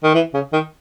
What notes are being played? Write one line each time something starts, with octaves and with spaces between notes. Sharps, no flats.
D#3
E3
C#3
D#3